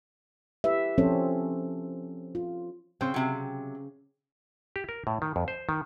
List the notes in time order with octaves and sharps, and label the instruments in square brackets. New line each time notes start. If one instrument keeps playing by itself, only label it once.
[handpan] E4 G4 B4 E5
F3 C4 C#4 A4 C5 C#5
F4
[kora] C#3 C5 G5 [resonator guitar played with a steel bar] C4
[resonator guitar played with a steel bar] C3 F#3
[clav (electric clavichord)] G4
A#4
A2
D#3
F2
C5
D#3